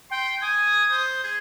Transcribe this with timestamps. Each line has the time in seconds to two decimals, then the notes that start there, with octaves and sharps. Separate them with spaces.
0.11 G5 C6
0.42 G#5 D#6
0.91 C5
1.24 G#4